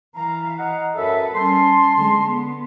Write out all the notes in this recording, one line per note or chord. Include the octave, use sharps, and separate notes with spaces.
E3 F5 A#5
D#5 F#5 A#5
F#2 A4 B4 E5
G3 C#4 A5 C6
D3 G#3
B3